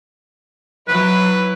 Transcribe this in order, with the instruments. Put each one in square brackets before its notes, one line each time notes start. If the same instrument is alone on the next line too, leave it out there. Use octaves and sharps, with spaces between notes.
[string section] F#3 E4 [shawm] B4